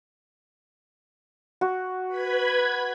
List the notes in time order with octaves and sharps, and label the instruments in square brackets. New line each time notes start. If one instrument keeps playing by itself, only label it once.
[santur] F#4
[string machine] B4 B5 G#6